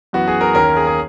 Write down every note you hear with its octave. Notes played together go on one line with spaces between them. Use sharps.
F#2 E3 B3 F#4
G#4
A#4
D#2 D#3 A#3 C#4 A#4
G#4
G#4